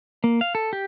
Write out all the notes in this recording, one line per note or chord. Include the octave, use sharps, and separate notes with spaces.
A#3
F5
A4
G4